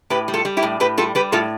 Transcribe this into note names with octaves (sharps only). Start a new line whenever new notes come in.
A2 G4 B4
G3
F4 A4
G3
E4 G4
A2
A2 G4 B4
G3 F4 A4
G3 G4 B4
A2 F4 A4